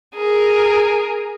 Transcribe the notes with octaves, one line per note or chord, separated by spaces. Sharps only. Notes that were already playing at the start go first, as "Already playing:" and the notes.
G#4 A#4